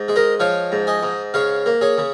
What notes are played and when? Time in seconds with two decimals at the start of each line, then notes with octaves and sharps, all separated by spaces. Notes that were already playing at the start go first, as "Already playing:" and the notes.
Already playing: G#2
0.08 G#3
0.16 A#4 D#5
0.40 F3 C#5 F5
0.72 G#2
0.87 D#5 G#5
1.03 G#2
1.34 C#3 C#5 F5
1.66 A#3
1.81 G#4 C#5
1.98 C#3